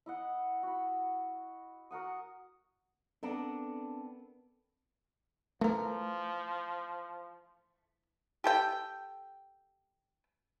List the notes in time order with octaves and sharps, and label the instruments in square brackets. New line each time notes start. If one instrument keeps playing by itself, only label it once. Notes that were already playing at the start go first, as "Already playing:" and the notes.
[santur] E4 D#5 F#5
F#4 B5
F#4 A#4 F#5 D#6
[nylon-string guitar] B3 A4 A#4 [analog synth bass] C4 [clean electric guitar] D4
[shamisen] E3 A#4 [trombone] F3 [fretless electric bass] A3
[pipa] G4 A4 G5